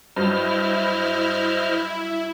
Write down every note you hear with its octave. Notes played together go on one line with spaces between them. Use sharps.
G2 F#3 E4 C5 D#5 F6